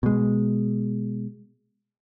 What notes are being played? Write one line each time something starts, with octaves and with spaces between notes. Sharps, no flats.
B2 G#3